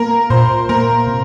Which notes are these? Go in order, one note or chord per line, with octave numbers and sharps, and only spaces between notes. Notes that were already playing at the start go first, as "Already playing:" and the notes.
Already playing: A#3 A#4
A#2 C5
A#3 A#4
C3